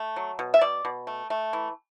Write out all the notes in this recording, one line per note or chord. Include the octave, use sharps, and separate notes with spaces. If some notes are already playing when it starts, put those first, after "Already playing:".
Already playing: A3
F#3
B2
E5
B2 D5
B2
A3
A3
E3